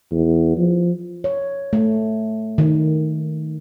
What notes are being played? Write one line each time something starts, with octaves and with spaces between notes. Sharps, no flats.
E2
F3
C#5
A3
D#3